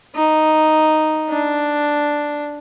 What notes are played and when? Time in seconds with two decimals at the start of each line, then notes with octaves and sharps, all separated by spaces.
0.15 D#4
1.30 D4